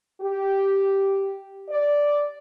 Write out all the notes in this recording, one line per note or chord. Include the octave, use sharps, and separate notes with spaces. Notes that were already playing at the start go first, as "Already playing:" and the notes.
G4
D5